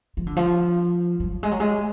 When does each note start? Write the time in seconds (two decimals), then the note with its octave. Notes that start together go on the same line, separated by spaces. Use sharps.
0.17 F3
0.27 D3
0.37 F3
1.20 F3
1.24 F#3
1.43 G#3
1.51 F#3
1.60 G#3